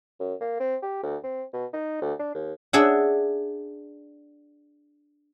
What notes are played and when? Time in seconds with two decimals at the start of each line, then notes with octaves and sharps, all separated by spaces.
0.20 F#2
0.41 A#3
0.60 C4
0.83 G4
1.03 D2
1.24 C4
1.53 B2
1.74 D#4
2.02 D2
2.19 D4
2.34 D#2
2.73 D4 G#4 E5 F#5